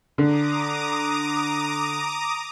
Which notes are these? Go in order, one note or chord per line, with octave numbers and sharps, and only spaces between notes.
D3 A#5 D6 D#6